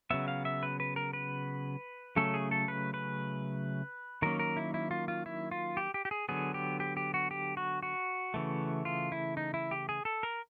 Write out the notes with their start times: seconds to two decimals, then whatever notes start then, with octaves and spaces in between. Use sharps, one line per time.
0.10 C#3 F#3 B3 E5
0.28 F5
0.45 E5
0.63 B4
0.80 B4
0.96 A#4
1.13 B4
2.16 C#3 F#3 A3 C#4 A4
2.34 G#4
2.51 A4
2.68 B4
2.94 B4
4.22 D#3 F#3 A#3 C#4 A#4
4.39 A#4
4.57 E4
4.74 E4
4.91 F4
5.08 F4
5.26 E4
5.51 F4
5.77 G4
5.94 G4
6.05 G4
6.11 G#4
6.29 D3 F#3 B3 G#4
6.54 G4
6.80 G4
6.97 G4
7.14 F#4
7.31 G4
7.57 F#4
7.83 F#4
8.34 C#3 E3 A3
8.85 F4
9.12 E4
9.37 D#4
9.54 E4
9.71 G4
9.89 G#4
10.05 A4
10.23 A#4